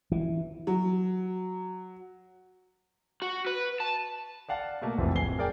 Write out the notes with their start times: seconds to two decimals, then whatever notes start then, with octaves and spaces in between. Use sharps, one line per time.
0.12 E3
0.67 F#3
3.22 F#4
3.47 B4
3.80 A5
4.49 D5 F5 F#5 A5
4.81 B2 A3 A#3
4.98 F1 F2 E3
5.15 D1 G#5 C7 G7
5.38 G#4 A#4 D5 G5 G#5